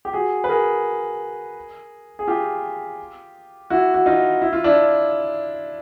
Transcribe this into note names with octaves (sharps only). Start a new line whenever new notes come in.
G4
F#4 G#4
B4
G#4 A#4
G#4
F4 G4
E4 F#4
F#4
D#4 F4
E4
F4
D4 E4